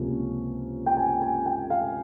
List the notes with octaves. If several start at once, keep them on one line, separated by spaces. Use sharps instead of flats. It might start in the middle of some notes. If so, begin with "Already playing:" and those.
Already playing: C#2 C3 F3 A#3 C#4
G5
G#5
G#5
G5
F5